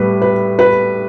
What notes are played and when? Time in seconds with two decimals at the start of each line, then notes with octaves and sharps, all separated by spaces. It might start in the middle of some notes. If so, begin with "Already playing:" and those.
Already playing: A2 G3 B4
0.22 B4
0.59 B4